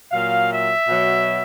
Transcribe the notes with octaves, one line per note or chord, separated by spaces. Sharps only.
A#2 F#3 F5
E5
B2 F#3